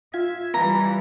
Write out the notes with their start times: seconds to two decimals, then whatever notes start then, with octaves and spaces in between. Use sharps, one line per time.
0.14 F4 E5 F5 G#6
0.54 E3 G3 A#5